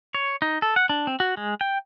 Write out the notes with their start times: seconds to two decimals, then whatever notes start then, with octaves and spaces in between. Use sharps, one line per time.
0.15 C#5
0.42 D#4
0.62 A4
0.76 F#5
0.90 D4
1.07 C4
1.20 F#4
1.37 G#3
1.61 G5